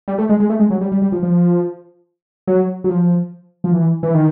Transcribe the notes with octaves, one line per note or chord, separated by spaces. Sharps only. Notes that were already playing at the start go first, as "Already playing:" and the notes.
G3
A3
G#3
G#3
A3
G#3
F#3
G3
G3
G3
F3
F3
F#3
F#3
F3
F3
E3
E3
D#3